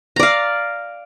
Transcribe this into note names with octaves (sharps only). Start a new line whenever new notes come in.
D5 F5 A#5